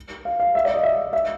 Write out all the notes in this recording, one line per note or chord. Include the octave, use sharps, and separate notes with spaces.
F5
F5
E5
D5
D#5
E5
E5